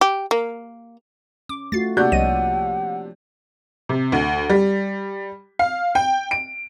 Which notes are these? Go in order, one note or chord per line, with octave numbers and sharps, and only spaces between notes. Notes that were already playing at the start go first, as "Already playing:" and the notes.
G4
A#3
C#4 D6
A3 F4 F#4 A6 C7
C3 A#3 D4 F#4 D5 F#5 G6
C2 F3 C#5 D#5 D#7
C3
D2
G3
F5
G5
D7